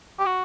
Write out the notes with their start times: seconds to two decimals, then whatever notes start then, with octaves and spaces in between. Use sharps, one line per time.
0.19 G4
0.26 F#4